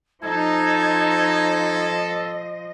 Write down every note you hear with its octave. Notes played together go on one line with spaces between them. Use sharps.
F3 C4 D#4 A4 D#5 G#6